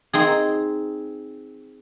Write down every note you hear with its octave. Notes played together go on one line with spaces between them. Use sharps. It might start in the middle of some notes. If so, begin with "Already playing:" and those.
C4 D#4 G#4